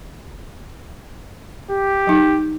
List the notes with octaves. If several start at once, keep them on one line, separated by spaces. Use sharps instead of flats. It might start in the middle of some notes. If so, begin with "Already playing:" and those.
G4
F#3 D#4